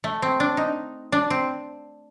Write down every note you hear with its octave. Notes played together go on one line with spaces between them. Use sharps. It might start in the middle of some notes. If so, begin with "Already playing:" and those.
A3
C4
D4
D#4
D4
C4